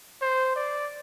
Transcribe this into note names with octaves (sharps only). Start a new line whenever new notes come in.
C5
D5